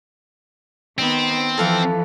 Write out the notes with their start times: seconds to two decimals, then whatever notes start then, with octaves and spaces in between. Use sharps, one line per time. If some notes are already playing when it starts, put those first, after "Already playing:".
0.98 D#3 B3 C4
1.58 E3 F3 A4 F5 F#5